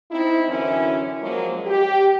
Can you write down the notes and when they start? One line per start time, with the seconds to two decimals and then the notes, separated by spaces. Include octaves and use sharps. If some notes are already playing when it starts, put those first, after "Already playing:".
0.11 C4 D#4 E4
0.49 F#2 D3 E3 C#4 E4
1.21 F3 F#3 G#3 A#3
1.67 G4